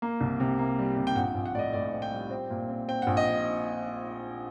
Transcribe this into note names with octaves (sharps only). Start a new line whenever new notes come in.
A#3
C2
C3
A#3
G3
C3
G5
A#1 F#5
A#1
F#5
A2 D5 D#5
A2 D5
C4
G5
G3
C4
A#2
C4
C4 G5
A#1 F#5
D#5